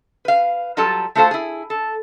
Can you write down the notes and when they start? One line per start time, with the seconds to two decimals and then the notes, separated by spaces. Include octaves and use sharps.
0.25 B4 F5
0.77 F#3 G3 F4 A4 A5
1.15 A3 F4 F#4 A4 C5 F5
1.31 E4 G#4
1.70 A4